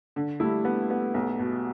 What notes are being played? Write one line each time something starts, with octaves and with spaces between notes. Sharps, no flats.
D3
G3 A3 E4
B3
B3
B1
B2